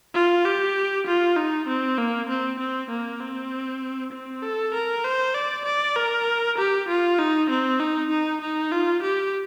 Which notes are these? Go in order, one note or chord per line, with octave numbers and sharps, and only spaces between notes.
F4
G4
F4
D#4
C4
A#3
C4
C4
A#3
C4
C4
A4
A#4
C5
D5
D5
A#4
G4
F4
D#4
C4
D#4
D#4
D#4
F4
G4